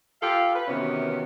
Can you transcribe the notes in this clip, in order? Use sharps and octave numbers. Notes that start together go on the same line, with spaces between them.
F4 G4 A4 F5
B4
C3 D#3 E3 B3 C#4 F#4